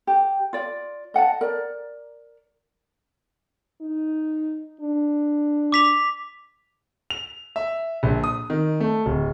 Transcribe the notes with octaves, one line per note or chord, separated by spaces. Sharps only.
G4
F4 D5
D#5 F#5 G5 A5
A#4 D5
D#4
D4
D6 B6 F7
F7
E5
A#1
D#6
D#3
A3
D1